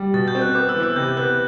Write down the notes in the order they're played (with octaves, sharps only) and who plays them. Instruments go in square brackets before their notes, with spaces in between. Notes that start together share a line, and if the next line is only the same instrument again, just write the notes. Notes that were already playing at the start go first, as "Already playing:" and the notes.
Already playing: [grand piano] G3
[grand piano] B2 [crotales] A6
[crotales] G6
[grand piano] C4
[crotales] F#6
[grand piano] B3 [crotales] D6
[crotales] E6
[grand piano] E3
[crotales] E6
[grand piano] C3 [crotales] G6
[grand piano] B3 [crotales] F#6